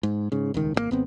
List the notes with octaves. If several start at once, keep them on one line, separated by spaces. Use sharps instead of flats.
G#2
G#2 C#3
D#1 C#2 D#3
G#1 C3 A#3
G#1 B3 C4